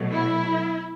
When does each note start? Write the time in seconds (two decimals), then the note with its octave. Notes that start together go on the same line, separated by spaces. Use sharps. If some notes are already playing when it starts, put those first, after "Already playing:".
Already playing: B2 F#3 A3
0.12 E4